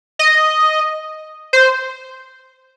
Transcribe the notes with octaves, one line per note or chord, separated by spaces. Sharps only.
D#5
C5